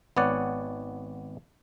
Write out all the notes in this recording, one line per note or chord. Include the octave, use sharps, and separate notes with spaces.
G#1 B3 C#5 D5 F#5